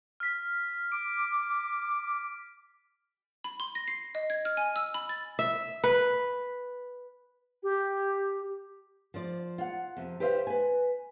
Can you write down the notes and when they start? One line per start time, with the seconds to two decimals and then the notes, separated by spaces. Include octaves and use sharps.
0.20 F6 B6
0.92 D6 D7
3.44 B5
3.60 C6
3.75 A#6
3.88 C7
4.15 D#5
4.30 G#6
4.45 F6
4.57 G#5
4.76 E6
4.94 B5
5.09 A6
5.39 E5
5.84 B4
7.63 G4
9.14 F3 C5 D5
9.58 F4 F#5
9.97 F2 C3
10.20 G4 B4 C5 D5 E5 F5
10.47 B4 G#5